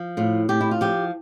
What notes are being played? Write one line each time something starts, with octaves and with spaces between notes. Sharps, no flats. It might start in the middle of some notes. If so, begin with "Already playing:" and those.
Already playing: F3
A2 F4
A2 G4
E4
F4
F3 G4